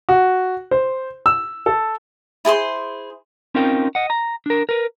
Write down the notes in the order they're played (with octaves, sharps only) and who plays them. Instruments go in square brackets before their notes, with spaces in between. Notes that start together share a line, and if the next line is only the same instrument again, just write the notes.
[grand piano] F#4
C5
E6
A4
[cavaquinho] E4 G#4 C5 C6
[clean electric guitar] C4 C#4 D#4 F4 A#4 G5
D#5 F#5
A#5
D4 A#4
A#4 B4